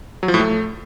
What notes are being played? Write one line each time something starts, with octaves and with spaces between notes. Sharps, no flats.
F#3
F3
A2
A3